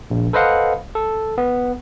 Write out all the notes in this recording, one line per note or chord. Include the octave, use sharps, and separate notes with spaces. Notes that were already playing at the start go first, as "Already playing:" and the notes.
A#1
A4 B4 C5 D#5 F5 F#5
A4
B3